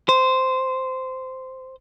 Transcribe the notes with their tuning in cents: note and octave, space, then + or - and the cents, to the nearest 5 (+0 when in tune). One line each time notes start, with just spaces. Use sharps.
C5 -10